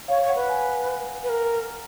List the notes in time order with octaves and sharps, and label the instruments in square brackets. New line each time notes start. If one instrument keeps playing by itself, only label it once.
[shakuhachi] C#5 [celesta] F5
[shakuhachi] C#5
[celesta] F#5
[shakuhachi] B4
[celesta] G#5
[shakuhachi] B4
A#4